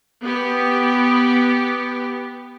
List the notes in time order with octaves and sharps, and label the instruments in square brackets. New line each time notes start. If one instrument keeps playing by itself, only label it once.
[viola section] B3 G4